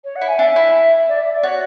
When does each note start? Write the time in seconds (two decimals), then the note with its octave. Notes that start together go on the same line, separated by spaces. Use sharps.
0.04 C#5
0.15 F#5
0.21 E4
0.27 G#5
0.38 D4 E5
0.56 E4
1.08 D5
1.20 E5
1.32 D5
1.43 F#4 C#5